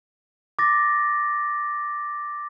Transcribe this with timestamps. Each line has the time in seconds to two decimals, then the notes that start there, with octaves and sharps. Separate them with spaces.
0.59 D6 A6 A#6